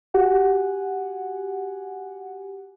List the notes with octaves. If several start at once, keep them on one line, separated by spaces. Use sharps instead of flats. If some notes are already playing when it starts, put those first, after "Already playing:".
F#4 G4 F#5 G#5